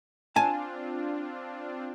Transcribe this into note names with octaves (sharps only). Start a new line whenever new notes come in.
C4 D4 F4 G#5 A5